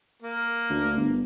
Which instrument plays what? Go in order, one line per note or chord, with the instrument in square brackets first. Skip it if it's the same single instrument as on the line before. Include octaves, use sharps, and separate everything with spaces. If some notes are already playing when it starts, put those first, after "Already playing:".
[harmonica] A#3
[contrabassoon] D2
G1